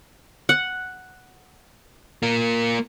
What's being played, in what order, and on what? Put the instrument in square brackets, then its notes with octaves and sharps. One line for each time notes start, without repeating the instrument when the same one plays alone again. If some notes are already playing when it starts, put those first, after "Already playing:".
[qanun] F#5
[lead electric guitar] A#3 F4